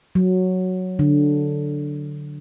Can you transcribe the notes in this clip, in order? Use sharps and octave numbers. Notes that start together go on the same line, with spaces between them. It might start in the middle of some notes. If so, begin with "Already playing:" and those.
F#3
D3